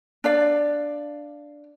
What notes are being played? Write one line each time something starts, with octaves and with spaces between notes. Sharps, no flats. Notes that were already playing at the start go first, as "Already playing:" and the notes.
D4 D5 F5